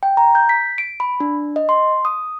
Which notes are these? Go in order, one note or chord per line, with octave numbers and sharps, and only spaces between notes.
G5
A#5
G6
B6
D7
B5
D4
D#5
C6
D#6